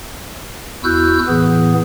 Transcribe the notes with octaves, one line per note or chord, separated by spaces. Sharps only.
E2 E4 F#4 E6 F#6 G6
A2 E3 B3 G#4